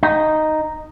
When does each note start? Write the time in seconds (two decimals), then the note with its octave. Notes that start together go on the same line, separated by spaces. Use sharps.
0.03 D#4